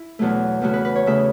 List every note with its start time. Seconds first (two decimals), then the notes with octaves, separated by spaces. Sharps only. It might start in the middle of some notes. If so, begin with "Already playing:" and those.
Already playing: E4
0.19 E2 B2 F#3 A3
0.62 E2 C#3 A3 F#4
0.74 B4
0.85 B4
0.96 C#5
1.06 E2 C#3 A3 E5